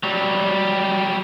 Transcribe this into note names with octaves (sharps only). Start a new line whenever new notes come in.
F#3 G3